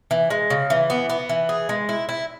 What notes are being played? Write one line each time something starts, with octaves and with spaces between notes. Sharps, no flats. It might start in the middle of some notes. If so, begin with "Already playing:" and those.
E3
G#3
C#3
E3
B3
B3
E3
G#4
G#3
E4
E4